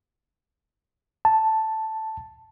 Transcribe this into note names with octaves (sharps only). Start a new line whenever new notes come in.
A5